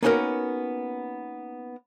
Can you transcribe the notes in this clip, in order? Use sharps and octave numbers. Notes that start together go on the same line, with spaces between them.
A#3 B3 C#4 D#4 F#4 A#4